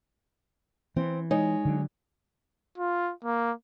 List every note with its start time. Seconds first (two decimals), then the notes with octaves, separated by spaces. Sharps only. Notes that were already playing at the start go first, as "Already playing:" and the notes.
0.96 E3 C4
1.31 G#3 D#4 C#5 D#5
1.65 D3 F#3
2.78 F4
3.25 A#3